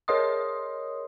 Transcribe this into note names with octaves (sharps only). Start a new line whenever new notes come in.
G#4 A#4 C#5 D#5 C6 D#6